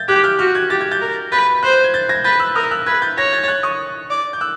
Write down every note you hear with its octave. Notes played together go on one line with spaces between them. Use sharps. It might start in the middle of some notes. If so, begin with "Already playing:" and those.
Already playing: G6 A6
G4 F#6 G#6
F6 G6
F#4 F6 G6
F#6 G#6
G4 A6
G#6
G6 A6
A#4
B4 G6 A6
C5 F#6
G6
G#6
G6 A6
G#6 A#6
B4 G6 A6
E6 F#6
A#4 D#6 F6
E6 F#6
B4 F#6 G#6
G6 A6
C#5 G#6 A#6
G6 A6
A6
F#6 G#6
C#6 D#6
D5
G6
E6 F#6